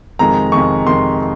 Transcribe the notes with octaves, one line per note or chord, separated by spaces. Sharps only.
F2 C3 D#3 G#3 A#5
F2 C3 D#3 G#3 C#6
F2 C3 D#3 G#3 C6